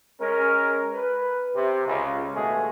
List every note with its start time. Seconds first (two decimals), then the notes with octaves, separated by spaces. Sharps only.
0.20 G#3 C#4 A#4
0.93 B4
1.55 C3
1.87 C#2
2.35 D#2 B2 G#3 A3 G#4